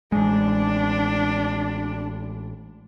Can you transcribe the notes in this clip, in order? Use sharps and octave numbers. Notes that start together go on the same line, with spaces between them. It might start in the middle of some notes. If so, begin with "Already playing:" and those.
A1 G#3 D4